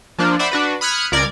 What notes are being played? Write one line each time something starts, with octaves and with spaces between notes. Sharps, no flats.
F3 A#3 D4 F4
C5 D5 E5 F#5 B5
D4 F#4 B4
B5 D#6 F6 F#6 G#6 C#7
C#2 A#4 D5 G#6